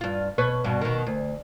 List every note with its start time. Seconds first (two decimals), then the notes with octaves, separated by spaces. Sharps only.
0.01 G2 F4
0.38 B2 B4 C#5
0.64 G2 B2
0.81 B2 D#3
1.07 D2